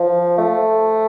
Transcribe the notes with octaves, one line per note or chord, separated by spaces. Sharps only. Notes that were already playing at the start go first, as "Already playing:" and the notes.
Already playing: F3
A3